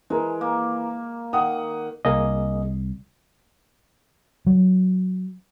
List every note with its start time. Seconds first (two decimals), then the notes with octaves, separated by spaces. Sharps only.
0.10 E3 G#3 A#4
0.41 A#3
1.33 D#3 F#5 D#6
2.05 C2 A#3 G#4 D#5
4.47 F#3